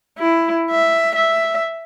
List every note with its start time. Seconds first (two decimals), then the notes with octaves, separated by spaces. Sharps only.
0.18 E4
0.71 E5
1.15 E5